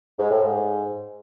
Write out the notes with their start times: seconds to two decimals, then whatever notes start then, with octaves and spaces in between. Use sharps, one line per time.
0.19 G#2
0.31 A2
0.43 G#2